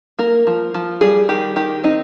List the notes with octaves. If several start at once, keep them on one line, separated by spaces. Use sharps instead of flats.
A#3 A#4
F3
F3
G3 G#4
D#3 G4
D#3 G4
C4 D#4